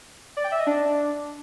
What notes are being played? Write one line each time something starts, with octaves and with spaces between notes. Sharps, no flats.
D5
G5
E5
D#5
D4